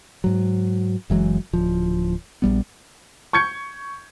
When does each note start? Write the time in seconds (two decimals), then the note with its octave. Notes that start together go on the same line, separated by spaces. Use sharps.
0.24 G#2 F#3
1.10 F#1 E3 F#3 G#3
1.53 D1 F3
2.42 A#1 G3 B3
3.33 C#6 G6 G#6 C#7